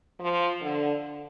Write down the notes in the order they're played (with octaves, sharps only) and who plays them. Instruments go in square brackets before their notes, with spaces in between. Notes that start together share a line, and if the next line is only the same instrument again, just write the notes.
[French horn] F3
D3